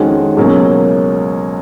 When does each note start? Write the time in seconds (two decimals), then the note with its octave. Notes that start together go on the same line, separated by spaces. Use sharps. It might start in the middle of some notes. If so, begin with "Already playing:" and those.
Already playing: F2 D#3 G#3 C#4 F#4
0.36 C#2 B2 F#3 A#3 C#4